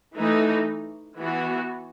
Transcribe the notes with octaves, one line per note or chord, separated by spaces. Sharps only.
E3 A3 D#4
E3 B3 F#4